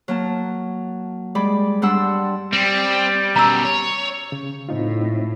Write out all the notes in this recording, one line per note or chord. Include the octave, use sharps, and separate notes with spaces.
F#3 A#3 A5
G3 G#3 D5 B5 D6
G2 G3 D4 F#5 C6 E6
G3 C4
F#2 B2 A#5 E6
C#5
C#3
A2 C4 D#4 F4